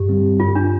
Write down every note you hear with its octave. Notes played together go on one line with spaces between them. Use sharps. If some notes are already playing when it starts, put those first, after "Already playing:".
Already playing: G2 G4
D3 G3 C4
G2 F4
D4